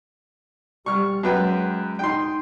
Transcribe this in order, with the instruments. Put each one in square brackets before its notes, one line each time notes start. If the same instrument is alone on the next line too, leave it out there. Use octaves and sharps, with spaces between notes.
[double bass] G3 [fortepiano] C#6 F6
[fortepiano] F#2 B4 G5 [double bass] G#3
[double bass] D#4 [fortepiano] G5 C6